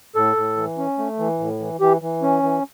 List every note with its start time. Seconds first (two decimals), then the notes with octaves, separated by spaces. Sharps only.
0.15 A2 A4
0.36 A2
0.57 E3
0.78 C#4
0.98 A3
1.19 E3
1.39 A2
1.60 E3
1.80 E3 G4
2.02 E3
2.22 C#4
2.43 E3